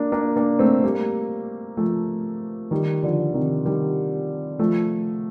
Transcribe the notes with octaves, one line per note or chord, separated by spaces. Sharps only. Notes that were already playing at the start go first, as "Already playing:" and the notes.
Already playing: A#3 D4
A#3 D4
A#3 D4
A3 C4
G3 A#3
F3 A3
D#3 G3
D3 F3
C3 D#3
D#3 G3
F3 A3